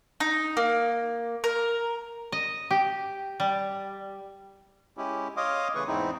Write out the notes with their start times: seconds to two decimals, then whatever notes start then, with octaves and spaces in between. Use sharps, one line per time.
0.20 D#4
0.57 A#3
1.44 A#4
2.32 D#5
2.71 G4
3.40 G3
4.97 G#3 C#4 E4 G4
5.37 C#5 D#5 F5 C6 D6 D#6
5.75 C#3 E3 A3 G#4 B4 C#6
5.87 E2 G#2 C4 D#4 E4